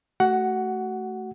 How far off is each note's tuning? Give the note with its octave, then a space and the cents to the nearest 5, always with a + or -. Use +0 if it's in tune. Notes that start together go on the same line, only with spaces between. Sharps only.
A3 +0 F#4 +25 F#5 +5